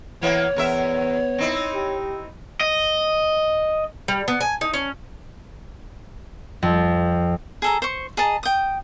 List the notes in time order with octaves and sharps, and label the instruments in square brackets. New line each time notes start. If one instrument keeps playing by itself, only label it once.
[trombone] E3 [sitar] A#3 B3 [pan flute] C#5
[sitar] E2 A#4 E5 [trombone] B3
[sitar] C4 D#4 E4
[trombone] G4
[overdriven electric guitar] D#5
[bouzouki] G3
B3
G#5
D#4
C#4
[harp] F2
[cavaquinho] G#4 A4 A#5
C5 C#6
G#4 D#5 A5 A#5
G5 D#6